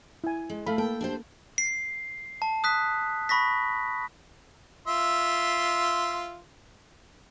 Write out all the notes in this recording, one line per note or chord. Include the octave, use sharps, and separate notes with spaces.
E4 G#5
G#3
A3 A4 F5 B5
A3 A#3 A4 G5
D4 G4 C5
C7
A5
D#6 F#6 B6
B5 C#6 A#6 B6
F4 E5 C6